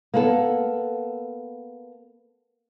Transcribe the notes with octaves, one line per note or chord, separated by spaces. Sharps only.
A#3 B3 A4